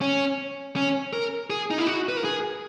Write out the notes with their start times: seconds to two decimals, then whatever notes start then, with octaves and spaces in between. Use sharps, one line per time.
0.01 C#4
0.76 C#4
1.13 A#4
1.50 G#4
1.71 D#4
1.78 E4
1.87 F#4
2.09 B4
2.17 A#4
2.24 G#4